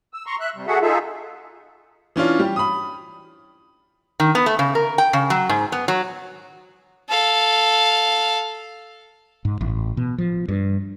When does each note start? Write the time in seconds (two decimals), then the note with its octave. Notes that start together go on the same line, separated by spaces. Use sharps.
0.13 E6
0.26 A#5 C6 C#6
0.40 E5 F#6
0.56 C3 G3
0.67 F#4 G#4 A4 E5 F#5
0.82 D#4 F4 G#4 A4 E5
2.16 E3 C#4 D4 F4
2.39 G3 G4
2.56 B5 D#6
4.20 D#3
4.35 B3
4.46 A3
4.59 C#3
4.75 A#4
4.98 G5
5.13 C#3
5.30 F#3
5.49 G#2
5.72 B3
5.88 F#3
7.08 A4 F5
9.45 G#2
9.61 A1
9.97 B2
10.18 F3
10.49 G2